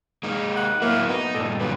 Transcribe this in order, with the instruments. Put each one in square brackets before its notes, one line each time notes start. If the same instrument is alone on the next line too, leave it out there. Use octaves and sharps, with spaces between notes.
[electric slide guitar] G#3 A#3 D#4
[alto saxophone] F#5
[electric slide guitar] F#3 A3 E4 [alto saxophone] A#3
[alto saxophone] B3 [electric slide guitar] D#4
[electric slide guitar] G2 A#2 [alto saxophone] A4
[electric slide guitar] A#2 D3 F#3 [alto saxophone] B4